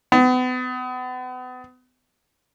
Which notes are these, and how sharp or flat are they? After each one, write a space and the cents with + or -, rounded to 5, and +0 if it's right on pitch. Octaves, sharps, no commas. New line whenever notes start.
B3 +35